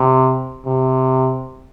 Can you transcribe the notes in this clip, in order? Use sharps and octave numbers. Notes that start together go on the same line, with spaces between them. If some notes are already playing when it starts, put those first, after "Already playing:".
Already playing: C3
C3